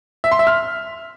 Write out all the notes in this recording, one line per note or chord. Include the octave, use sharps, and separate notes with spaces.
E5
C6
E5
F6